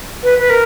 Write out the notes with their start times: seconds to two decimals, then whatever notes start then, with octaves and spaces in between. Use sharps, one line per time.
0.23 B4
0.39 B4
0.50 A#4